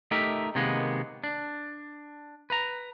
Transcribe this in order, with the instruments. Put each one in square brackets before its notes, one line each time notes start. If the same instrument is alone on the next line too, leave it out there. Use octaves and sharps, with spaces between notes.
[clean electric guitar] A3 D#4 G4 A#4 E5
C3 D#3 G#3 A#3 B3
D4
B4 A#5